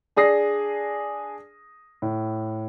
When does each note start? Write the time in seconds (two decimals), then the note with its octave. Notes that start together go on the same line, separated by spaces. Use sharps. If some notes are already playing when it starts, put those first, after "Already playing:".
0.16 D4 G#4 D#6 A#6 C7
2.02 A2